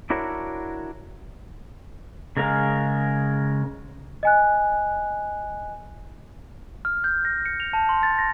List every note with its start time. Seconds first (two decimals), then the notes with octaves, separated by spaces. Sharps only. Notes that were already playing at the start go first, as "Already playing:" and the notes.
0.10 D4 E4 F#4 A#4 C#5
2.37 C#3 G#3 A#4 F5
4.23 D#5 G#5 F#6
6.85 F6
7.04 G6
7.25 A#6
7.46 C#7
7.60 F7
7.73 A5
7.89 C6
8.03 A6
8.18 A#6